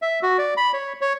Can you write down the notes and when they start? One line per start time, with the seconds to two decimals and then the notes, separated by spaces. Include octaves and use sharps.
0.02 E5
0.23 F#4
0.38 D5
0.57 B5
0.74 C#5
1.01 C#5